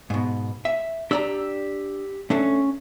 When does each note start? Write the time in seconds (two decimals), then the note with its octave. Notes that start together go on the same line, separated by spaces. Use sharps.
0.10 G#2 B2
0.65 E5
1.11 D4 G4 D5 A#5 E6
2.30 A3 C#4 D4 A4